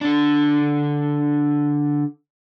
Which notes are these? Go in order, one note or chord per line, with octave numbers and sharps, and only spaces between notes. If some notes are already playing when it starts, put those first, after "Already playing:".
D3 D4